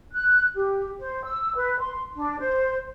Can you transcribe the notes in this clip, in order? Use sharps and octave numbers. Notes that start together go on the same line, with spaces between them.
F#6
G4
C5
E6
B4
C6
D4
C5